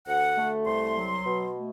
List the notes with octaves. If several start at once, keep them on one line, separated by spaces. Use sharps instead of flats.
D2 F#5
A3
C2 C6
F#3
B2
A3